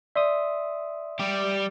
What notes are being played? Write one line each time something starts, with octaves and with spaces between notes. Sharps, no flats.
D5 E5 C6 D#6
G3 G4